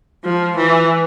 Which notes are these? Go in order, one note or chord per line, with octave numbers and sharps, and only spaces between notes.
F3
E3